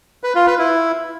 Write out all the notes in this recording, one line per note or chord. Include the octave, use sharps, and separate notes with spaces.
B4
F4
B4
E4